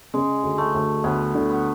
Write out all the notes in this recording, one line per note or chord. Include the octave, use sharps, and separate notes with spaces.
C#3 G#3
D2
A3
D2
D2 B3
D3
B3